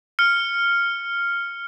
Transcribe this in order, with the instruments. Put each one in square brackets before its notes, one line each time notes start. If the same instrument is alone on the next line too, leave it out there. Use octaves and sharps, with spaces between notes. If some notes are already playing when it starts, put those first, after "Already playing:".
[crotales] F6 C#7